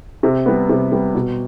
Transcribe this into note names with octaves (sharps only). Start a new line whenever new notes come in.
C3
G3 B3
C3
G3 B3
B2